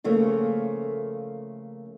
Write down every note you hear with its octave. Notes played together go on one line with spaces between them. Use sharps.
C#3 F3 A3 A#3